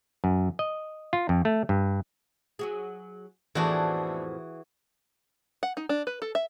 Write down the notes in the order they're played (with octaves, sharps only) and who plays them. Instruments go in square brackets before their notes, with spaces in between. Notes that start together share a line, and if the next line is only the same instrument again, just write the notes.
[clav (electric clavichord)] F#2
D#5
F4
F2
A3
G2
[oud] F#3 F#4 G#4
[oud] F2 A2 [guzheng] E3 F#4 G#4 [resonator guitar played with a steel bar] A3 B3 D4
[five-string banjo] F#5
D#4
D4
B4
A4
E5